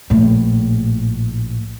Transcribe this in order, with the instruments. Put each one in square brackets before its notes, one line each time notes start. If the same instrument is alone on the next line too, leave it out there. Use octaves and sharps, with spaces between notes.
[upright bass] A#1 A2